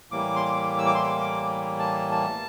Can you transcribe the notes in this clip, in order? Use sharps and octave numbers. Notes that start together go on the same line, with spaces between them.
A2 E3 G3 A#3 D6
C6
D6
E6
D6
C6
D6
A5
A5